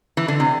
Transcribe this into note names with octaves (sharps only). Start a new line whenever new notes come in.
E3
D3
C3